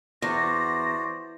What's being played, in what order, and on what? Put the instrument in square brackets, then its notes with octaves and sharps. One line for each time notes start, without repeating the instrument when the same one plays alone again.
[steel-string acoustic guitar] E2 [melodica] F#4 C5 D5 [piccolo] A#6